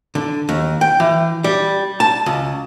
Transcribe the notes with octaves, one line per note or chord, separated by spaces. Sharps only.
D3
D#2
G5
E3
G3
A5
C#2